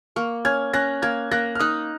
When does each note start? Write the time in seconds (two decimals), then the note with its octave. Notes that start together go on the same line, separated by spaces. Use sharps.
0.16 A#3 C#6 F6
0.45 C#4 F6 G#6
0.73 C#4 F#6 A#6
1.02 A#3 F6 G#6
1.31 A#3 F#6 A#6
1.55 F6
1.60 D#4 D#6 F#6